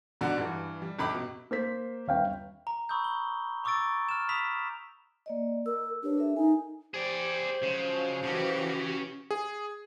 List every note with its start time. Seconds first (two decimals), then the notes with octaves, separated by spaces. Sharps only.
0.21 G#2 B2 D3 D4 F#4
0.38 G2 E3
0.82 G3
0.99 G1 C#2 B5 D6
1.14 B2
1.51 A#3 C5 B6
2.08 G1 D#2 C#5 F5 G5
2.67 A#5
2.89 B5 C#6 D#6 E6 G6
3.04 G7
3.64 A#5 C#6 D6 E6 A6 D7
4.09 F6 E7
4.28 B5 C#6 D#6 B6 F7
5.26 A#3 D5 D#5
5.66 A#4 E6
6.03 D4 G4 B4 C#5
6.18 A4 A#4 E5
6.36 D#4 G#5
6.94 G4 G#4 C5 D5
7.63 C#3 F3 F#3 G#3
8.24 C#3 E3 C#4 F#4 G4
9.31 G#4